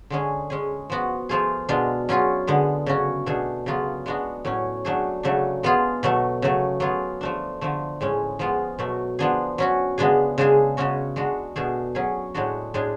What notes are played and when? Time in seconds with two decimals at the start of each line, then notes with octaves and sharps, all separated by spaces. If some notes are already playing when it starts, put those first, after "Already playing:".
0.10 D3 G#3 C#4 G#4
0.50 G#3 C#4 G#4
0.90 F3 B3 F#4
1.29 F3 A3 F4 G#4
1.69 B2 G#3 D4 F4
2.09 F#3 C#4 F4 G#4
2.47 D3 G#3 B3
2.86 C#3 F#3 C#4 F#4
3.26 B2 A3 D4 G#4
3.66 C#3 F#3 B3 F4
4.06 G#3 B3 D4 F#4
4.45 A2 F#3 C#4
4.85 F#3 A3 D4 G#4
5.23 C#3 F#3 A3 D4
5.63 G#3 B3 F4 G#4
6.03 B2 F#3 A3
6.42 C#3 F#3 A3
6.80 F#3 B3 F4 G#4
7.21 F3 A3 D4
7.61 D3 F3 A3
8.01 A2 G#3 C#4
8.39 F3 G#3 B3 F4
8.79 B2 F#3 A3
9.19 F3 B3 D4 G#4
9.58 F#3 C#4 F#4
9.98 C#3 G#3 B3 D4 G#4
10.38 C#3 G#3 D4 G#4
10.77 C#3 G#3 C#4 F#4
11.16 G#3 D4 F#4
11.56 B2 A3 D4 G#4
11.95 F#3 C#4 G#4
12.34 A2 G#3 D4 F#4
12.74 A2 G#3 D4 G#4